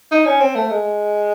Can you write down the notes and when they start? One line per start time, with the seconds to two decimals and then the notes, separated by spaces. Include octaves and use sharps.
0.11 D#4
0.25 C#4
0.40 C4
0.55 A3
0.70 G#3